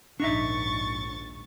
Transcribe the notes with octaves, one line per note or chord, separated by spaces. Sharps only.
A#1 D#2 G#2 D4 D#4 E5 C#6 A6